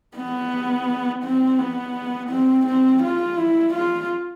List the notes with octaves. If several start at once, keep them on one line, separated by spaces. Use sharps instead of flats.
B3
C4
B3
C4
C4
F4
E4
F4